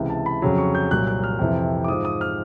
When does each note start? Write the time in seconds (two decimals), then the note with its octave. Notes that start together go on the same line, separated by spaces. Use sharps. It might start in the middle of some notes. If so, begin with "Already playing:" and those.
Already playing: C#2 C3 E3
0.10 A5
0.26 B5
0.42 F2 C#3 F#3
0.58 C#6
0.75 G6
0.91 C2 A#2 F#3 F#6
1.07 F#6
1.24 F6
1.39 F2 C3 E3
1.84 D6
1.88 G#2 F3 D#6
2.05 D#6
2.21 F6